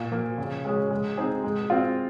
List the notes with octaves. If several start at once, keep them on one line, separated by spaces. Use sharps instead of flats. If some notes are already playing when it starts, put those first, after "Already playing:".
Already playing: A#2
F3 A#3
C#3
G#3 C#4 G#4
G#3
C4 D#4 G#4 C5
G#3
C4 F4